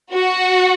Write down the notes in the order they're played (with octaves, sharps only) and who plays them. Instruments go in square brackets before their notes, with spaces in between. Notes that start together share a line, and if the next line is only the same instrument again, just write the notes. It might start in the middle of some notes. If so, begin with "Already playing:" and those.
[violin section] F#4